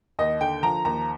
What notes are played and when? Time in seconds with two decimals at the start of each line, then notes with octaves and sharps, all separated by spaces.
0.19 D#2 D#5
0.41 D3 G5
0.63 F3 A#5
0.85 D#2 A#5